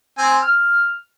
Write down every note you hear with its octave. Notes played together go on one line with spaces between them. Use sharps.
C4 G#5
F6